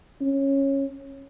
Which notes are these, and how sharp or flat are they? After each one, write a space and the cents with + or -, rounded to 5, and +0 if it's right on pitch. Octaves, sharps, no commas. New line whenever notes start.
C#4 -15